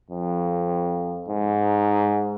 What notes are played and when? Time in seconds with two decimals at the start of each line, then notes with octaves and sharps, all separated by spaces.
0.10 F2
1.28 G#2